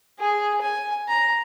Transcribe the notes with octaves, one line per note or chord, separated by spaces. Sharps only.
G#4
G#5
A#5